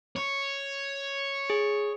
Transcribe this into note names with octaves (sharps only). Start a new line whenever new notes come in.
C#5
G#4